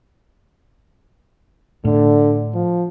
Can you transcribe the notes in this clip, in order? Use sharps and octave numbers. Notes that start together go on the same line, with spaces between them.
A2 D3
F3